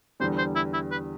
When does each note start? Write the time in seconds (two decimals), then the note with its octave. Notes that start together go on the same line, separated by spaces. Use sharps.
0.20 E2 D3 G3 C5
0.38 C5
0.56 E4
0.73 E4
0.91 B4